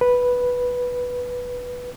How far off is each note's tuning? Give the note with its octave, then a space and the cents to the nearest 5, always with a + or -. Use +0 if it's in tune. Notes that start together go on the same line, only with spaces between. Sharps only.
B4 -5